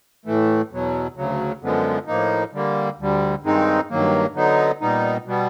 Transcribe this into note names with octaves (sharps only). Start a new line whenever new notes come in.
A2 E3 A3
E2 B2 F#3
D2 C#3 F#3
F#2 D3 F3 G#3 B3
A2 F3 A#3 D#4
D3 G3 A#3
D2 D3 G3
G2 D#3 G#3 C4 D#4
G2 D#3 F#3 A#3
D3 F#3 B3 D#4
A#2 G3 B3 D#4
B2 G3 B3